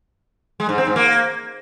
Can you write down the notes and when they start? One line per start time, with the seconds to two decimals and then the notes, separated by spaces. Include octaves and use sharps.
0.60 G#3
0.69 G#2
0.78 C4
0.87 G#2
0.96 A#3